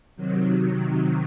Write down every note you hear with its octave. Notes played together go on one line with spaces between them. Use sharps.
C3 D#3 F#3